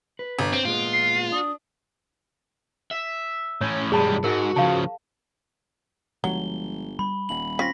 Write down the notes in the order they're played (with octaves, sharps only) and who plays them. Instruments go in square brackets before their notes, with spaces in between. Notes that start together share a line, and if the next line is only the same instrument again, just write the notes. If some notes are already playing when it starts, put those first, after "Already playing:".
[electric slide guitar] B4
[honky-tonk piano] G1
[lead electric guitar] C4 [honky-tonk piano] D7
[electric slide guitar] A#2 G#3 B3 [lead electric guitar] F4
[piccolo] C7
[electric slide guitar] D4 [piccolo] D#6
[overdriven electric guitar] E5
[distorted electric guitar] A2 C#4 [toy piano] C#5
[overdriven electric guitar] B1 G2 [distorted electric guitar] G3 G#3 [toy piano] G#4 A5 B5
[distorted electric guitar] G#2 [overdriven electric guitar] F#4 [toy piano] A#4
[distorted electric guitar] C#3 F3 [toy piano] F5 A5
[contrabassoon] G1 [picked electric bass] F3 G#3 [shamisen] F#3 [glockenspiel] G7
[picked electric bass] G3 [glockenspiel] B5
[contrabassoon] D#1 [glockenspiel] F#7
[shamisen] C4 C#4 F4 [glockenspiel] A#6 B6